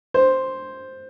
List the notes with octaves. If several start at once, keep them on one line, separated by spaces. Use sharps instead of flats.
C5